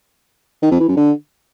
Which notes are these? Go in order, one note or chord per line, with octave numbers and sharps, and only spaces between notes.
D#3
F2
E3
F#2
D3